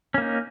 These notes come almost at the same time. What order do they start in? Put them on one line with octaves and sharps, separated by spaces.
C#4 A#3 D#4